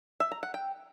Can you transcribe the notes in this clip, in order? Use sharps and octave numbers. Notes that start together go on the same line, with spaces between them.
E5
A#5
F#5
G5